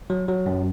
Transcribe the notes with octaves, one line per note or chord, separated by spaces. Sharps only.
F#3
F#3
F#2